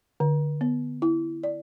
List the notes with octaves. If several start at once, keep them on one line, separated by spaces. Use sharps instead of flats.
D3
B3
E4
D5